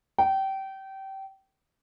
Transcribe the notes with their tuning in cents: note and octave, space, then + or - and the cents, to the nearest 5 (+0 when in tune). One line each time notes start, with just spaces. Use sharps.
G5 -25